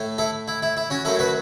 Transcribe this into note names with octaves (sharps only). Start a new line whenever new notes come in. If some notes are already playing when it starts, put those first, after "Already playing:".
Already playing: A2 A3
E4 A4
E4
E4
E4
C#4 F#4
F#2 F#3 A3 E4 A4
F#4 B4